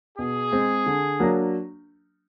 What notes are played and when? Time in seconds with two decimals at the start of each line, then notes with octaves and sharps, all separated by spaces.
0.18 B2 G#4
0.52 G#3 C4
0.86 D3
1.20 F#3 A#3 D4